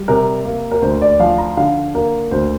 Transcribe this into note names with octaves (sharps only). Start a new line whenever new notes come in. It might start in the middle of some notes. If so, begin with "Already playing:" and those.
Already playing: G3
C3 A#4
A#3
A#4
D2 C5
D5
F3 F5
A#5
D3 F5
A#3 A#4
D2 C5